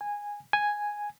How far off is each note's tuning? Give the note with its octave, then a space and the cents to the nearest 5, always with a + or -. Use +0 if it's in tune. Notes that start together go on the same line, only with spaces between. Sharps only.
G#5 -10
G#5 +0